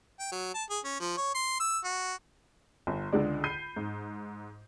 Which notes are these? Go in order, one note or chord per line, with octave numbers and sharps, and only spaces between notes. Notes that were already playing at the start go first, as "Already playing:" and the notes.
G5
F#3
A5
G#4
C#4
F3
C#5
C6
E6
F#4
G1
C#2 D3 G#3 D5
B5 G6 C7 D#7
G#2